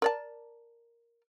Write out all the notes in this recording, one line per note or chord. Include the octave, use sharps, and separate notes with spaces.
A#4 D5 A5